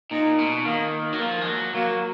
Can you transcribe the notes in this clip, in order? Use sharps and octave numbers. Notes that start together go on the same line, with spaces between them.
A#2 D#4
B2
D#3 A#3
F#3
F3 A#3
G#3
F#3
F#3 A#3